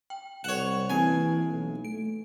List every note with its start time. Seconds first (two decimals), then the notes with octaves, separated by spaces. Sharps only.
0.10 G5
0.44 C2 C#5 F#5 E7
0.90 E3 A#3 C4 G#5
1.48 B1
1.85 A3 D7